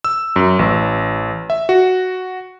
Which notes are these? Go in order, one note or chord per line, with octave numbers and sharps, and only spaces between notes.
E6
F#2
A1
E5
F#4